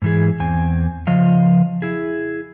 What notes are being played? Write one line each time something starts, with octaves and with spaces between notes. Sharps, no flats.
G#2 E3 G#4
E2 C4 G#5
C#3 F3 D#5 F5
E4 G#4